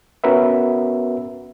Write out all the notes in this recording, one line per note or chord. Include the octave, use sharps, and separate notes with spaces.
B3 C#4 F#4 A#4 B4 E5